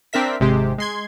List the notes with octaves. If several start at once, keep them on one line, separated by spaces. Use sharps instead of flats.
C4 D4 A#4 E5 B6
G#1 C3 G#3 G4 C5
G#3 C6 G#6